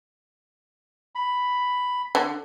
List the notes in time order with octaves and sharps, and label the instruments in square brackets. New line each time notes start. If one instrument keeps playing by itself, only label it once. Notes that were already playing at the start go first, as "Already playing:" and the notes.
[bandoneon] B5
[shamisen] D3